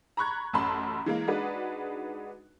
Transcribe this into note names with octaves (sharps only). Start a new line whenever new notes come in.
A#5 B5 C#6 F#6 G#6
A1 F#2 A5 B5 C6
E3 G#3 A#3
G#3 D4 D#4 F#4 B4